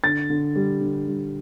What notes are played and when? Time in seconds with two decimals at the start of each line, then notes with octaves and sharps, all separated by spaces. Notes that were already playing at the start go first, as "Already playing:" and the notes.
0.04 D3 A6
0.30 D3
0.56 G3
0.81 D3
1.07 G3